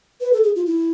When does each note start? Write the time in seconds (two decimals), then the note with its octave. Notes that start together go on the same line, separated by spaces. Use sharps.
0.21 B4
0.33 A4
0.43 G#4
0.56 F4
0.66 E4